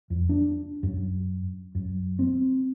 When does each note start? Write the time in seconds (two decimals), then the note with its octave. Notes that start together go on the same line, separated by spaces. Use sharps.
0.10 F2
0.29 D4
0.83 F#2
1.75 F#2
2.19 C4